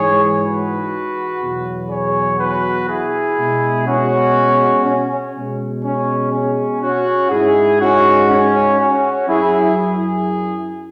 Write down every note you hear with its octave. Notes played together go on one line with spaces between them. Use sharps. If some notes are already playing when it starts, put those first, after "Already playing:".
Already playing: G#2 E3 G#3 G#4 C#5
F#4 B4
E2 B2 F#3
G#4 C#5
F#4 B4
E4 G#4
B2 G#3
C#4 F#4
C#4
B2 G#3
C#4
C#4
C#4 F#4
G#2 G#3 E4 G#4
C#4 F#4
C#4
C#4 F#4
F#2 F#3 E4 G#4
E4 G#4